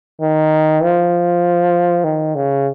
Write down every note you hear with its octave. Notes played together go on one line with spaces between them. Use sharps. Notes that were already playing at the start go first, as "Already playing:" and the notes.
D#3
F3
D#3
C#3